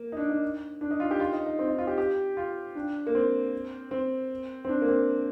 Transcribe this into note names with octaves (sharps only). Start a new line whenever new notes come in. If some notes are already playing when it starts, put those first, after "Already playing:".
Already playing: A#3
D#4
D4
D#4
D4
D#4
F4
G4
F4
D#4
D#4
C4
D#4
F4
G4
G4
F4
D4
A#3
C4
C4
C4
D4
A#3
C4